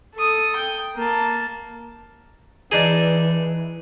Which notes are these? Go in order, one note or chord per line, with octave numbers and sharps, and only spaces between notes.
A4 D#6
G5
A#3 A5
E3 D4 D#4 G#4